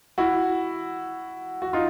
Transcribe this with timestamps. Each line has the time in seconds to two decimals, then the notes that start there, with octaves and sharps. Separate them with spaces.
0.18 E4 F#4
1.62 F#4
1.73 D#4 F4